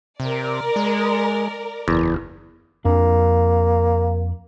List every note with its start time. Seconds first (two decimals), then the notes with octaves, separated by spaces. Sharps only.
0.20 C3 A#4 D5
0.76 G#3
1.88 F#1 E2
2.85 F2 A#3 D4